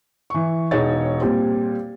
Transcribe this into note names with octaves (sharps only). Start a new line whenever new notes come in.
E3 C#6
E1 D#4 G#4 C#5 A6
A#2 G3 C4